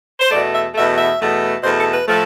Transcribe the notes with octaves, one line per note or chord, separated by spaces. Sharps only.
C5
E2 B2 A3 D5
E5
E2 B2 A3 E5
E5
E2 B2 A3
E2 B2 A3 C5
A4
B4
A2 F3 A3